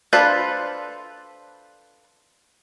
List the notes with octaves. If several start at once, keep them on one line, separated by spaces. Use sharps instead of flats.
D4 F4 A4 B4 C5